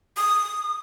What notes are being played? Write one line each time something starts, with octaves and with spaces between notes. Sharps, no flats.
D#6